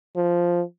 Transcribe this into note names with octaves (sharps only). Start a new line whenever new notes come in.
F3